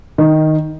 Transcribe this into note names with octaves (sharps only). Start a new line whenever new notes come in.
D#3